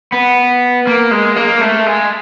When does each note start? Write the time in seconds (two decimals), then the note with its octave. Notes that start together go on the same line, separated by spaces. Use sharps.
0.12 B3
0.87 A#3
1.11 G#3
1.36 A#3
1.61 A3
1.87 G#3